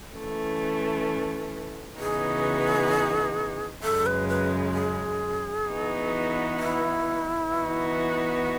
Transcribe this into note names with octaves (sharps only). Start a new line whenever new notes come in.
E3 A3 C#4
C#3 E3 B3 D#4 F#4 G#4
F#2 C#3 G#3 A4
B4
B4
G#4
E3 B3 D#4 F#4
E4
E3 B3 D#4 F#4